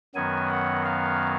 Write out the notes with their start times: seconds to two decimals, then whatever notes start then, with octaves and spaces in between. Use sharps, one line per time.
0.15 F#2 D#3 F#3 B3 G#5
0.50 F#5
0.85 F5